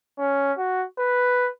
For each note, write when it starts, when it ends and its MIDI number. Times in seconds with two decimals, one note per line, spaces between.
0.19 0.52 61
0.58 0.84 66
0.99 1.50 71